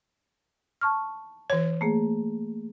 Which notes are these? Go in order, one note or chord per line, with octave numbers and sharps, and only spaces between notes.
A5 C#6 F6
E3 C#5
A3 A#3 G#4